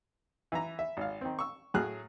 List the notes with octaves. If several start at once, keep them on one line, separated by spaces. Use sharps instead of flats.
E3 E5 A#5
E5
G#1 F5
D#3 C4
C#6 E6
A2 F#3 G#4 F6 F#6